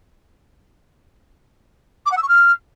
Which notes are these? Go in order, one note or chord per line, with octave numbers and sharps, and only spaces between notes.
D6
F#5
E6
C#6
F6